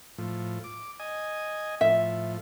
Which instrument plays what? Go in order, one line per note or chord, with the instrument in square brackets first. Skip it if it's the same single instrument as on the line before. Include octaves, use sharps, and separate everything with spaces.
[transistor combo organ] A2 F3
D6
D#5 G#5
[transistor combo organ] A2 F3 [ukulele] E5